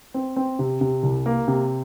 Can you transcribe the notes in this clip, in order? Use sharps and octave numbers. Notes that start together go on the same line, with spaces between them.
C4
C4
C3
C3
C2
A#3
C3